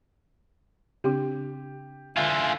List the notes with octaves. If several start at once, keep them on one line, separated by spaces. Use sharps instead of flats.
C#3 C4 D4 G4
D3 F4 E5 F5 G#5